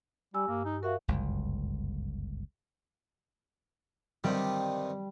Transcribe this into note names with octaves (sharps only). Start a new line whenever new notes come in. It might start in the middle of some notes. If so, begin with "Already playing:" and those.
G3 G4 G#5 E6
G2 A#3
D#4
F#4 A#4 E5 F5
G1 C#2 F#2
G2 C3 D#3 G3